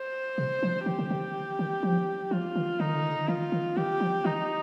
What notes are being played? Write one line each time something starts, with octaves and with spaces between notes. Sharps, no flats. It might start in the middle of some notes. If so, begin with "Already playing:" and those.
Already playing: C5
C3
F3
D#3 G4
D3
D3
D#3
F3
F3 F4
D#3
D3 D#4
D#3
D3
D#3
D3
D#3 F4
D#3
D#3 G4
F3
D#3 D#4